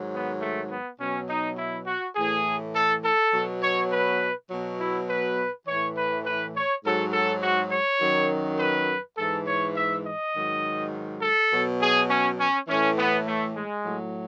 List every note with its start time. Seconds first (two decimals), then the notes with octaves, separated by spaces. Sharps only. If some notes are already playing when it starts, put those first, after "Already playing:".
Already playing: G#2 D#3 F#3
0.12 B3
0.41 A3
0.70 B3
0.99 B2 F#3 C#4
1.29 D#4
1.58 E4
1.86 F#4
2.16 A2 E3 G#4
2.74 A4
3.04 A4
3.33 B2 F#3
3.62 C#5
3.92 B4
4.50 B2 F#3
4.79 E4
5.09 B4
5.67 A2 E3 C#5
5.97 B4
6.25 B4
6.55 C#5
6.84 G#2 F#3 A4
7.13 A4
7.42 F#4
7.71 C#5
8.01 F#2 D#3 F#3
8.59 B4
9.18 G#2 E3 A4
9.47 C#5
9.76 E5
10.05 D#5
10.35 G#2 D#3 F#3
11.22 A4
11.51 B2 F#3
11.81 G#4
12.09 C#4
12.39 C#4
12.68 A2 E3 C#4
12.97 B3
13.26 A3
13.56 G#3
13.85 A2 F#3